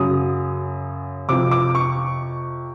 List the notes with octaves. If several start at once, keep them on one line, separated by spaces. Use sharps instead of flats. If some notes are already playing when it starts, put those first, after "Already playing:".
Already playing: F#2 C#3 F#3 D#6
F2 C3 F3 D6
D6
C#6